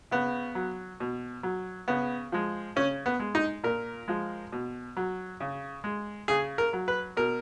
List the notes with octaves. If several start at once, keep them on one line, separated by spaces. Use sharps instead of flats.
C#3 B3
F#3
B2
F#3
C#3 B3
F3 G#3
C#3 C#4
B3
G#3
D#4
A#2 A#4
F3 G#3
B2
F#3
C#3
G#3
C#3 G#4
A#4
F#3
B4
B2 A#4